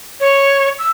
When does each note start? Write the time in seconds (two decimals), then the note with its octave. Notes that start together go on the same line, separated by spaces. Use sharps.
0.20 C#5
0.79 E6